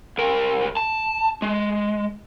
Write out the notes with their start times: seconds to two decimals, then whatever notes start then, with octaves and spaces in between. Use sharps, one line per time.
0.18 C2 A#4
0.77 A5
1.42 G#3